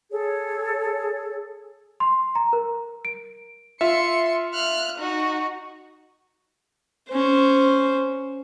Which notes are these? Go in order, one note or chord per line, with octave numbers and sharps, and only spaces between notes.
G#4 A4 C#5
C6
A#5
A#4
D7
F4 E5 C6 C#7
F6 F#6
D#4 F#4
C#4 C5